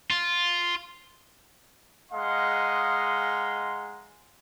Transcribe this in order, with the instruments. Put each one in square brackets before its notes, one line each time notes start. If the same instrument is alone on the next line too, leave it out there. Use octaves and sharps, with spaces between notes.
[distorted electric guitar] F4
[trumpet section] G#3 D#5 F5 F#5 A#5 C6